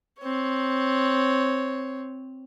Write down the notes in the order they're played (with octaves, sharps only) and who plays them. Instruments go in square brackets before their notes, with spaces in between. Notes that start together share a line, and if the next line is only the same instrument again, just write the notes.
[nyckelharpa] C4 C#5